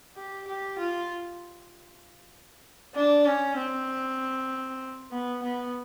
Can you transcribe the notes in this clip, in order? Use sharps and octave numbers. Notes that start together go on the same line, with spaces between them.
G4
G4
F4
D4
C#4
C4
B3
B3